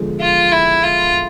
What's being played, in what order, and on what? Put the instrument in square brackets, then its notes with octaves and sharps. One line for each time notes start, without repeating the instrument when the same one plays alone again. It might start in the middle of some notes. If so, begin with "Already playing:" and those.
Already playing: [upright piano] D3 F3 G#3 B3
[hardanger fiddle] F4
E4
F4